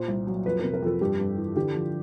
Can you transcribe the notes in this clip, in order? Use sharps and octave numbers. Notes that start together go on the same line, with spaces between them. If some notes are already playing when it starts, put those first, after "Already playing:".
Already playing: A#2 C5
C2
F#3
F2 B4
C3 A#4
A#4
F2 A4
G2 G4
G2
E3
D3 G4
F3